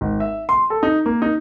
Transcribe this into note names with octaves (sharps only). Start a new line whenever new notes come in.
G#1
E5
C6
A4
D#4
A#3
D#4